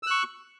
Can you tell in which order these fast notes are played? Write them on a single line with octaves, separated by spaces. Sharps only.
E6 F#6 C#6